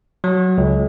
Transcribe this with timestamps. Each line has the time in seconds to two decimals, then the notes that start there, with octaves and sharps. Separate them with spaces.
0.24 F#3
0.58 C#2